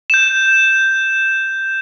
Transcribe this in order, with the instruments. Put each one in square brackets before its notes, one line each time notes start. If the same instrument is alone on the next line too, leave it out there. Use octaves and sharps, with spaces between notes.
[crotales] G6 E7